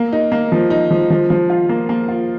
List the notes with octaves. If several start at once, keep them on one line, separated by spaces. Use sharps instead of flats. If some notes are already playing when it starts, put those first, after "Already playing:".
Already playing: A#3
D#4
A#3
F3
D#4
F3
F3
F3
F4
A#3
A#3
F4